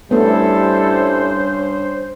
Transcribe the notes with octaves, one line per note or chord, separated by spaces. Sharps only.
G2 G3 A3 B3 C#4 E4 A4 C5